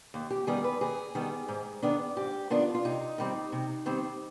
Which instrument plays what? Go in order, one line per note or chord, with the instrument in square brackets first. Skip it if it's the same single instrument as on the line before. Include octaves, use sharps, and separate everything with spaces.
[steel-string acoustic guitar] D#2
G4
D#3 G3 B3 G#4
B4
D#2 G#4
D#3 G3 B3
G#2
D#3 B3 D4
G#2 G4
D#3 B3 D4 F4
F4
C3 D#4
D#3 G3 C4
C3
D#3 G3 C4